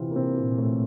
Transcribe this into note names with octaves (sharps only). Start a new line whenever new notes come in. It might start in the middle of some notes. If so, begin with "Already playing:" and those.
Already playing: C3 E3 C4 E4 F4
A#3
C3 C4
A#2 A#3
A2 A3